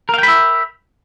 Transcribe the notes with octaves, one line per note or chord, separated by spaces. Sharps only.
A#4 E5 F5 G5 B5